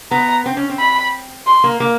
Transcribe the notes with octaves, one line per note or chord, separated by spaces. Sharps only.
B3 A#5
C4
C#4
C4
B5
C6
A#3
A#3